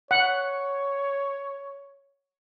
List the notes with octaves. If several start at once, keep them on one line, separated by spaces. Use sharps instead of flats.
C#5 F#5